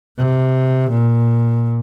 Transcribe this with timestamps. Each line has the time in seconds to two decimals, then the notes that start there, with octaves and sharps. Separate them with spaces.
0.17 C3
0.91 A#2